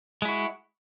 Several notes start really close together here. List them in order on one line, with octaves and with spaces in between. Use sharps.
G#3 E4 F#4